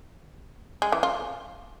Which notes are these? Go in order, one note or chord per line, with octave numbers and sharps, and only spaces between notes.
G#3
E3
F4